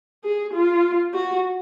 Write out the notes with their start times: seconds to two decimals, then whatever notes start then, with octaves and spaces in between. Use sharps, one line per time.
0.24 G#4
0.53 F4
1.14 F#4